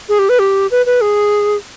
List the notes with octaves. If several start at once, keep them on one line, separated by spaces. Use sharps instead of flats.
G#4
G4
B4
G4
B4
B4
G#4